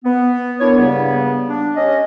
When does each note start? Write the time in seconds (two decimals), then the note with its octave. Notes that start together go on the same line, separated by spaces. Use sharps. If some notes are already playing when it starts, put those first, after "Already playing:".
0.05 B3
0.60 D4 E4 A#4 C#5
0.77 G2 C#3 G3 A#3 B3
1.49 D4
1.76 C#4 G4 D#5